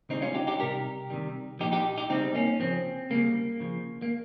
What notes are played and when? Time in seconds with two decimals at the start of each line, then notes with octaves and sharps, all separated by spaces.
0.09 C#3 G3 C4 D#4
0.22 C#4 F4
0.35 D#4 G4
0.47 D#4 G4
0.60 C3 G3 G4 A#4
1.10 C3 D#3 G3
1.59 A#2 F3 D#4 G4
1.72 D#4 G4
1.98 D#4 G4
2.10 C#3 G3 C4 D#4
2.35 A#3 C#4
2.60 C#3 F3 C4
3.10 C#3 G3 A#3
3.60 C#3 F3
4.02 A#3